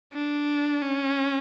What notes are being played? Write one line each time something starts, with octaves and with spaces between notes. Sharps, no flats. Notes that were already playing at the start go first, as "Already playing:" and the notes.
D4
C#4